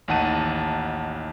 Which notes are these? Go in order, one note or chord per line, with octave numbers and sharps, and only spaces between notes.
A1 D#2 D#4 F#5 A5 D#7